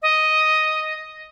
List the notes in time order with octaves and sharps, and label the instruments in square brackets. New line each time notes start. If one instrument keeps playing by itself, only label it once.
[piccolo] D#5